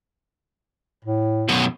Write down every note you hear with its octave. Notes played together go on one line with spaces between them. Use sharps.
A2
F#2 B2